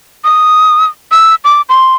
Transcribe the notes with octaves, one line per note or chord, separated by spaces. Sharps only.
D#6
E6
D6
C6